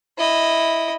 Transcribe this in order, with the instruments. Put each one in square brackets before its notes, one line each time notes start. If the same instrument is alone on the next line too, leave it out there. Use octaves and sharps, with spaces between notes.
[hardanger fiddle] E4 D#5